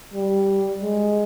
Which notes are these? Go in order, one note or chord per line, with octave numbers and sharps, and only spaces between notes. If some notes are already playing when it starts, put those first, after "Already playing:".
G3
G#3